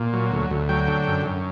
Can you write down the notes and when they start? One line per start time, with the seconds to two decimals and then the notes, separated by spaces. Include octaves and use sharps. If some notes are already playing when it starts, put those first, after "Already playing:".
Already playing: A#2
0.13 F#3
0.32 D2
0.51 D2
0.69 F#3 G5
0.88 D3
1.07 F#2
1.26 F#2